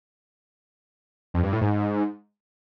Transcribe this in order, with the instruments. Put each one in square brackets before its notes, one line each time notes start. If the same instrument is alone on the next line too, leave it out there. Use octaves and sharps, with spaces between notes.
[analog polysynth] F2
G2
A2
G#2